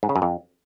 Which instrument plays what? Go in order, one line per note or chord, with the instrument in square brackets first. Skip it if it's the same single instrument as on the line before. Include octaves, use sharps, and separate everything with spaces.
[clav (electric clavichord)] G#2
C#3
F#2
F2